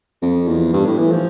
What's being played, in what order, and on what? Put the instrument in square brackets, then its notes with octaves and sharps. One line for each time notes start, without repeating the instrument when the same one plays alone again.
[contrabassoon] F2
E2
G2
A2
E3
F3